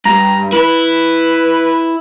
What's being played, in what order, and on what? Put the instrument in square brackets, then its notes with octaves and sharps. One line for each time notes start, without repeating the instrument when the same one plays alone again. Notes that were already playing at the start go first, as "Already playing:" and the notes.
[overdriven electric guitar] G2 [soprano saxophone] A#5
[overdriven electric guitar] E4 [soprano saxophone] B4